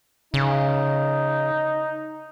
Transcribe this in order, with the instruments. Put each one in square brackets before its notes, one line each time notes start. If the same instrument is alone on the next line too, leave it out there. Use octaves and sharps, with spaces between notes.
[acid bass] C#3 [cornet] D#4